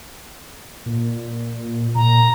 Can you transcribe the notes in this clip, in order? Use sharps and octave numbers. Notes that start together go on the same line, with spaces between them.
A#2
A#2 A#5